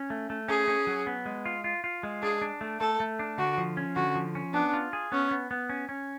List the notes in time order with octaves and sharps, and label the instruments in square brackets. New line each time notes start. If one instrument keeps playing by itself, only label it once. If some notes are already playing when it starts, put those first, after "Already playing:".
Already playing: [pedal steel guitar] C#4
A3
A3
[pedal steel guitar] C#4 [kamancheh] G#4
[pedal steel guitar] C#4
F#3
B3
G#3
F4
F4
F4
G#3
[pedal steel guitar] D4 [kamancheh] G#4
[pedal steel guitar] D4
A3
[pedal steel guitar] A3 [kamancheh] A4
[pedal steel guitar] A3
D4
[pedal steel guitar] D3 [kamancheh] F#4
[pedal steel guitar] F3
C#4
[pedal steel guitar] D3 [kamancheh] F#4
[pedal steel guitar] F3
C#4
[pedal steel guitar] B3 [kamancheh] D4
[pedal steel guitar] F4
G#4
[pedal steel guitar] B3 [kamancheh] C#4
[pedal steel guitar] B3
B3
C#4
C#4